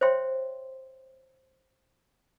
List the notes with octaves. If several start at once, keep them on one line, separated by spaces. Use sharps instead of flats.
C5 C#5 E5 G5 C6